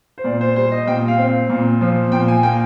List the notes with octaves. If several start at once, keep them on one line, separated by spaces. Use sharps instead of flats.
C5
A#2 D5
C5
G3 C5
D#5
A#2 G5
F5
C4
A#2
F3
A#2 G5
G#5
A#3 G5